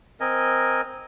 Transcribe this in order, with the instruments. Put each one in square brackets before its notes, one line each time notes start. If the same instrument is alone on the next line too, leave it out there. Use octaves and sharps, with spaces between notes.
[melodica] C4 A#4 D#5 G#5